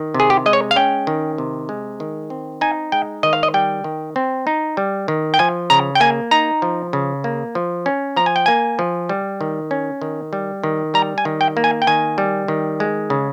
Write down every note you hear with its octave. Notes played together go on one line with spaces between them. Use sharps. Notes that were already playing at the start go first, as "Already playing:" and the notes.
Already playing: D#3
C3
G#4
G4
G#3 D#5
C#5
F5
C#4 G5
D#3
C3
G#3
D#3
C4
D#4 G#5
G#3 G5
D#3 D#5
F5
D#5
G3 G5
D#3
C4
D#4
G3
D#3
G5
F3 G#5
C#3 A#5
G5
A#3 G#5
D#4 A#5
F3
C#3
A#3
F3
C#4
F3 A#5
G#5
G5
A#3 G#5
F3
G3
D#3
C#4
D#3
G3
D#3
G3 A#5
G#5
D#3
G5
A#3
G#5
G5
D#3 G#5
G3
D#3
G#3
C#3